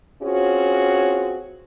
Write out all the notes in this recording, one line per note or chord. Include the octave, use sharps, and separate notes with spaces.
C4 C#4 F4 F#4 G#4 C#5